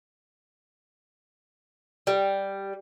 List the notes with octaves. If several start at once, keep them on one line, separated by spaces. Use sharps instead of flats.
G3